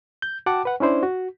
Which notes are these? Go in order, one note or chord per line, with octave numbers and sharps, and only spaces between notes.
G6
F#4 F#5 G5 A5 D6
B4 F#5
C#4 D4 E4 C5 D5
F#4